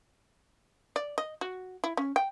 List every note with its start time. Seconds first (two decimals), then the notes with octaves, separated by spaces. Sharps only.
0.96 D5
1.18 D#5
1.41 F#4
1.84 E4
1.97 C#4
2.16 G5